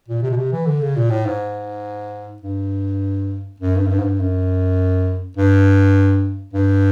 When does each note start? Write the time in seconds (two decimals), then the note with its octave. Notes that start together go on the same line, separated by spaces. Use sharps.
0.08 A#2
0.23 C3
0.31 B2
0.37 C3
0.52 E3
0.66 D3
0.81 C#3
0.96 A#2
1.10 A2
1.26 G#2
2.42 G2
3.60 F#2
3.76 G2
3.86 F#2
3.90 G2
3.99 G#2
4.04 G2
4.19 F#2
5.37 G2
6.53 G2